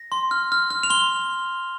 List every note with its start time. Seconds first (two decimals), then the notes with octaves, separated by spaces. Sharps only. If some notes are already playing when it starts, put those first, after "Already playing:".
Already playing: A#6
0.12 C6
0.31 F6
0.52 F6
0.70 F6
0.83 F7
0.90 C6 G7